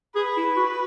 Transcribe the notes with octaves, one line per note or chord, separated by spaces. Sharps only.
G#4 B4
E4
F#4